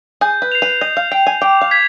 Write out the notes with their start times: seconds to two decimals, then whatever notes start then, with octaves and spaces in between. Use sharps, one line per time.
0.21 G#4 G6
0.42 B4
0.52 C7 F7
0.62 B4
0.81 D#5 G6
0.97 F5
1.11 G5 C7 F7
1.27 G#5
1.42 G5 D6
1.61 F5
1.71 G#6 B6